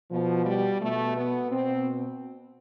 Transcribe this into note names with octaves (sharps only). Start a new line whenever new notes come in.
B2 F3
G3
B2 A3
B3
B2 C4